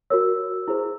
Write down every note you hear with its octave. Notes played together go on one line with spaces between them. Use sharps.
F#4 A#4 C#5 E6
E4 G#4 C5